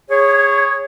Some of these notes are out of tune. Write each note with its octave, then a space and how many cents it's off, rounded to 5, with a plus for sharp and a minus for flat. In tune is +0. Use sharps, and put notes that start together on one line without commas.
G#4 -20 C#5 +0